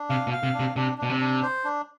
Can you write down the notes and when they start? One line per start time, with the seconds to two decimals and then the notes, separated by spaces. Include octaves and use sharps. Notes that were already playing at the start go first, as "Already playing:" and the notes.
Already playing: D4
0.10 C3 F5
0.27 B2
0.32 F5
0.43 C3
0.54 D4
0.60 C3
0.76 C3 D4
0.98 B2 D4
1.10 C3
1.21 D4
1.42 C5
1.64 D4